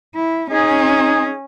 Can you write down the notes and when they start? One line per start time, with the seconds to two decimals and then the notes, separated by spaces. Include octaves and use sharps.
0.15 E4
0.51 C#4 D#4 G#4